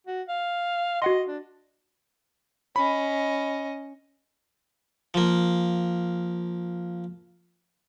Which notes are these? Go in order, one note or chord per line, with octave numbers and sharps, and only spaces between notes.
F#4
F5
F#4 D#5 F#5 C6
D4
C#4 D#5 B5
F3 A#3